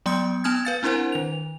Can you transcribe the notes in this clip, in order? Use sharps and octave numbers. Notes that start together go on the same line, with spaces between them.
F#3 B3 C6 D#6 G6 C#7
B3 G#5 A5 D#6 F6 G#6
B4 F5 A6
C4 D4 E4 A#4 C5 F#5
D#3 F7